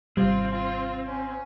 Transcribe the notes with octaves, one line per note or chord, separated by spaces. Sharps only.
G#1 C3 G3 C4 F4
F4
C#4